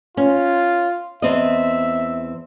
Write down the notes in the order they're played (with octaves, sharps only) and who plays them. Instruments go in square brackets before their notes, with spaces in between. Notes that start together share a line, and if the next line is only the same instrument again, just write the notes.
[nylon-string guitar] C#4 [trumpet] F4
[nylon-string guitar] E2 C4 D#5 [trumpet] E5